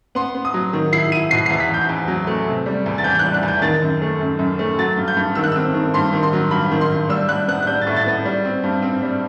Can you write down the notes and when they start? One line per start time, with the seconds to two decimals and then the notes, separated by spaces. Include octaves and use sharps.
0.15 B3 C6
0.35 B3
0.45 D#6
0.54 F#3
0.73 D#3
0.92 E4 C7
1.12 E4 D#7
1.31 B2 C7
1.46 C7
1.50 E2
1.60 B6
1.70 E2 G6
1.89 E2
2.08 F#3
2.27 A3
2.47 C3
2.66 G3
2.86 E2
2.98 A6
3.04 E3 G6
3.15 G6
3.19 F#6
3.25 G3
3.34 F#6
3.43 E2
3.48 G6
3.62 D#3 A6
3.82 F#2
4.02 A3
4.21 F#2
4.39 F#2
4.59 A3
4.79 F#3 A6
4.97 G2
5.08 G6
5.16 G2
5.35 D#3 E6
5.44 F#6
5.52 C4 E6
5.74 D#3
5.94 G2 C6
6.13 D#3
6.23 C6
6.33 F#3
6.51 G2 B5
6.71 D#3
6.81 C6
6.91 G2
7.09 G3 E6
7.29 G3 F#6
7.48 B3 F#6
7.63 F#6
7.67 G3 G6
7.81 A6
7.87 A2
7.96 A6
8.06 B3
8.25 G3
8.45 C4
8.63 G2
8.82 C4
9.02 G3